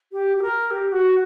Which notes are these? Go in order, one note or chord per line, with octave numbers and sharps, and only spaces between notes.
G4
G4
A#4
G4
F#4